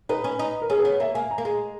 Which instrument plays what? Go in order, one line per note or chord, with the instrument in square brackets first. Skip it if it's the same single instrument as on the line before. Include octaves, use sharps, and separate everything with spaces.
[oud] D#4 [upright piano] B4
[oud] C#4
D#4
[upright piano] A#4
[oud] C#4 [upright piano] G#4
[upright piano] B4
[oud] B3 [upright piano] C#5
[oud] A#3 [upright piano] E5
[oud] A#3 [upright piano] G#5
[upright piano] A#5
[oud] A#3
G#3